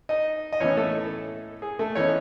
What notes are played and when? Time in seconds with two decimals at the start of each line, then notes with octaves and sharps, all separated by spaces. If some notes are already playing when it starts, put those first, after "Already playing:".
0.09 D#4 D#5
0.53 D#5
0.60 A2 E3 B3 C#4 D#4 C#5
0.77 A3 A4
1.62 G#4
1.79 A3 A4
1.95 E3 B3 C#4 D#4 C#5